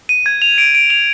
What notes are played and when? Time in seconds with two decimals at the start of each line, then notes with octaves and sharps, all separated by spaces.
0.09 D#7
0.26 G#6
0.42 F7
0.58 D7
0.75 D7
0.90 F7